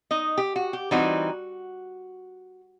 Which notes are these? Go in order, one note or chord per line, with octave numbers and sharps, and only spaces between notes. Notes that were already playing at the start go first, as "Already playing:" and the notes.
D#4 D#5
G4
F#4
G4
E3 G3 C4 D#4 F#4